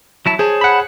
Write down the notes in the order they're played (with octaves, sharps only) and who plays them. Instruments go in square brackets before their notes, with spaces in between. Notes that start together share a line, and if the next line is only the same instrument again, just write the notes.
[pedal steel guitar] F#3 E4 A5
[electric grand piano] G#4 [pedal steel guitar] C5 C#5 A5
[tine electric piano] F#5 B5